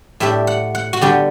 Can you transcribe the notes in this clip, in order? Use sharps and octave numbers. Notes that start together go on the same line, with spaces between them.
A2 G3 D4 E5
F#5
F#5
F#4
D3 G3 B3 D4 G4